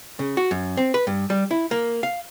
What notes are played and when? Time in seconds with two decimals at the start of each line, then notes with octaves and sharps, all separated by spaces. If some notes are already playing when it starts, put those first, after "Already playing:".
0.19 C#3
0.37 F#4
0.51 F#2
0.77 C4
0.94 B4
1.07 G2
1.30 G3
1.51 E4
1.71 A#3
2.03 F5